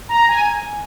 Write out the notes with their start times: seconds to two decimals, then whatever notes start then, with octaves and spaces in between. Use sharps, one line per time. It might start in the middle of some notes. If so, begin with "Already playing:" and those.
0.09 A#5
0.28 G#5